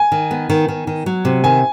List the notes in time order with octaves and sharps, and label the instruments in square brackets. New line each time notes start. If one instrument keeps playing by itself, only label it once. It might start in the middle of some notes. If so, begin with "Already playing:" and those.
Already playing: [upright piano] G#5
[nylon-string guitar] D#3
B3
D#3
D#3
D#3
F#3
C3
[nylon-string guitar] D#3 [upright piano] G#5